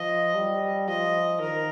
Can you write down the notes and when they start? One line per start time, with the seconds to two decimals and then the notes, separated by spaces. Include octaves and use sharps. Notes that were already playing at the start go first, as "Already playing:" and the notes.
Already playing: F3 D#5
0.35 G3
0.88 F3 D#5
1.40 D#3 A#4